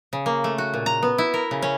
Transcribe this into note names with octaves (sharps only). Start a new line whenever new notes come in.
C#3
A#3
A3
F#4
A#2
A#5
B3
E4
A#4
C#3
C#4